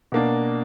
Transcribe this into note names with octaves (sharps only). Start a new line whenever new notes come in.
B2 A#3 D4